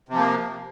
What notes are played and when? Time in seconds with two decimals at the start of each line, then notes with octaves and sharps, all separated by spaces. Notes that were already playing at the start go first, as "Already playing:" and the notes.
0.09 C3
0.14 F3
0.18 A#3